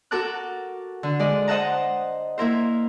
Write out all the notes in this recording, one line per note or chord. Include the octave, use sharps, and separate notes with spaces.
F#4 A4 A#4 A5 D6 F#6
D3
G#3 D5 D#5
C5 D#5 F#5 A5 A#5
A#3 E4 A#4 C5